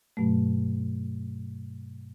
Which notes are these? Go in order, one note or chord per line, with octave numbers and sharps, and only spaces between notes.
G2 B2 F#3 A3